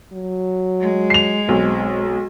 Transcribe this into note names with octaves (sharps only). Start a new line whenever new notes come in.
F#3
G#3
C7 F7
B1 C4